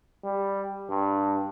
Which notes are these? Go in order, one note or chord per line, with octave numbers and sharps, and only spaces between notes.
G3
G2